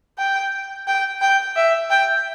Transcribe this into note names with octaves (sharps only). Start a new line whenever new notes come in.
G5
G5
G5
E5
G5